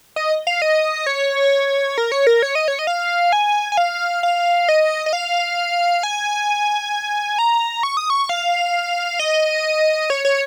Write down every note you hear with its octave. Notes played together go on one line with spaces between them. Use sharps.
D#5
F5
D#5
C#5
A#4
C#5
A#4
C#5
D#5
C#5
D#5
F5
G#5
G#5
F5
F5
D#5
D#5
F5
G#5
A#5
C#6
D#6
C#6
F5
D#5
C#5
C#5